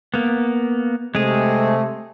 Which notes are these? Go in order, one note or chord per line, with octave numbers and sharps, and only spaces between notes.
A#3 B3
C3 G#3 A3 G#4